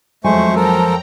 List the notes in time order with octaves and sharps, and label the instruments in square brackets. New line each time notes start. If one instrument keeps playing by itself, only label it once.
[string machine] F2 F3 F#3 [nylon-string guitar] G#3 G#5 [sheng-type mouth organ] A3 C5 C#6
[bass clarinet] F3 [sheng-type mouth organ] A4 A#4 [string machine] G5 A#5